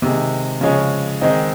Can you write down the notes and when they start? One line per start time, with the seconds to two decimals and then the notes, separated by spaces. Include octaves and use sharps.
0.02 C3 D#3 G#3
0.61 C#3 F3 G#3 C#4
1.21 D#3 G#3 C4 D#4